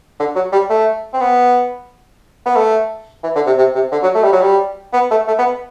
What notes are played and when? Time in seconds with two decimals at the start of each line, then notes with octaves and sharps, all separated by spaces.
0.20 D3
0.35 F#3
0.52 G3
0.70 A3
1.14 C4
1.21 B3
2.46 B3
2.56 A3
3.23 E3
3.35 D3
3.46 C3
3.58 C3
3.75 C3
3.92 D3
4.03 F#3
4.15 A3
4.23 G3
4.33 F#3
4.42 G3
4.93 B3
5.11 A3
5.28 A3
5.38 B3